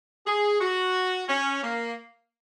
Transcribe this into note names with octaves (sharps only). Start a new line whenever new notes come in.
G#4
F#4
C#4
A#3